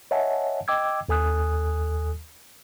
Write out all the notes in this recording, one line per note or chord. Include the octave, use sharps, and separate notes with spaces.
C#5 D#5 E5 F#5 G#5 A5
D#5 G5 D6 E6 G#6
D#2 A4 G#5 D#6 F#6